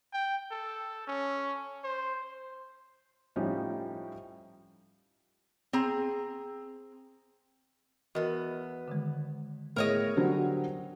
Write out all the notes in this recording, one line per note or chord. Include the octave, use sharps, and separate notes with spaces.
G5
A4
C#4
C5
A2 F3 G3 C#4 D#4
C4 G#4 A#5
E2 B3 F#4 A#4 D#5
D3 D#3 G#3
A2 B3 G#4 A#4 C#5 D#5
D3 F#3 G3 C5